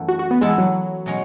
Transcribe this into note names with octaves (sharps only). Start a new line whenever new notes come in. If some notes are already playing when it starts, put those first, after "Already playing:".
Already playing: F#2 E3 A3
F#4
F#4
B3
E3 G#3 B3 E4 A4
F#3
B2 G#3 C#4